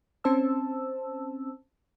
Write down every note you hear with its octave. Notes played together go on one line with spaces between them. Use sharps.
C4 C#4 C5 A5 E6